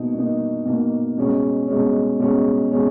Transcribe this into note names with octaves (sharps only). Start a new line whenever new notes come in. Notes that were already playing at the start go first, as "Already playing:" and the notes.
Already playing: B2 A#3 D#4
B2 A#3 D#4
B2 A#3 D#4
B2 G#3 C#4
B2 G#3 C#4
B2 G#3 C#4
B2 G#3 C#4